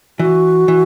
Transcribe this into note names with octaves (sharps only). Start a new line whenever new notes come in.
E3 F#4
E3